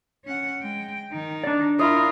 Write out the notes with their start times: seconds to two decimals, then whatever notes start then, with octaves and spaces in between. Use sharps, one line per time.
0.25 C#4 F#5
0.61 G#3 G5
1.12 D#3 D#4
1.44 D4 D5
1.79 E4 F4 A#4 D#5